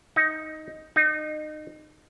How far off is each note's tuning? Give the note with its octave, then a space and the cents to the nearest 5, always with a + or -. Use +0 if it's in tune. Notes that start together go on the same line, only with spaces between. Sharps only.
D#4 +10
D#4 -25